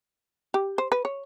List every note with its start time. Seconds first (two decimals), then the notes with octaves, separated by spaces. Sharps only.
0.54 G4
0.78 C5
0.92 B4
1.05 C#5